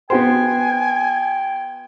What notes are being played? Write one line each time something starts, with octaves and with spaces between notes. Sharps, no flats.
B3 F#4 C5 G5 G#5